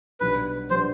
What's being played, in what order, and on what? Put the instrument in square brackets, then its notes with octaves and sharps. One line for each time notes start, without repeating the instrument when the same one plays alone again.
[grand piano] B1 B2 G3 B3 D4 [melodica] B4
[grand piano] B2 G3 B3 D4 [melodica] C5